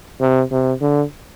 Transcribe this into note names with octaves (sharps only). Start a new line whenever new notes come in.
C3
C3
D3